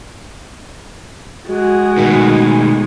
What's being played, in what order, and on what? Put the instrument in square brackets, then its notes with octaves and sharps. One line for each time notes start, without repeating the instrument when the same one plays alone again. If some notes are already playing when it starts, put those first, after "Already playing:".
[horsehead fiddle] G#3 G#4 [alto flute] F#4
[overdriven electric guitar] B2 A3 [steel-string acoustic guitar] D#3